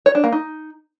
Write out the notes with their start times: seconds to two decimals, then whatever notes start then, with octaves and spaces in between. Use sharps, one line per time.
0.06 C#5
0.15 D4
0.24 A#3
0.32 D#4